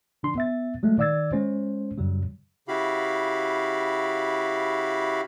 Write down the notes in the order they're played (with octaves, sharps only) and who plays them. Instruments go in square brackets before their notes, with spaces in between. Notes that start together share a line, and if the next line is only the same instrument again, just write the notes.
[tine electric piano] C#3 E3 D4 C6
B3 E5 A6
F#3 G#3 A3
D#3 D5 F5 E6 G#6 A6
G#3 C#4 C5
F#2 C#3 F#3 G3
[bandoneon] C#3 E4 F#4 G4 F5 B5